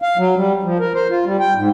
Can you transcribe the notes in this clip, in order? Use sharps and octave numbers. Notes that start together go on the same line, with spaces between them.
F5
F#3
G3
F3
A#4
C5
F4
G3
G5
G#2